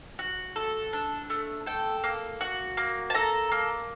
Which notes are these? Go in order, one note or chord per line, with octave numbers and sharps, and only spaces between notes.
F#4
A4
D4
A3
A4 G5
A#3
F#4
A#3
A5
A4 A#5
A#3